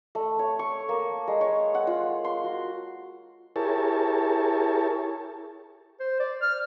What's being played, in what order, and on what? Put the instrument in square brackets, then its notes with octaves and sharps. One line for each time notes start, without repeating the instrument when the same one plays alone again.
[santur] A3
C#5
C#6
A#3
G#3
C#5
F#5
F4
C6
F#4
[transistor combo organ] E4 G4 G#4 A#4 C#5 A5
[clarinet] C5
D5
F6